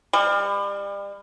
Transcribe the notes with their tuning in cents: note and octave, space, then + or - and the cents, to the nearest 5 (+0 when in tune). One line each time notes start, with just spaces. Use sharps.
G3 +35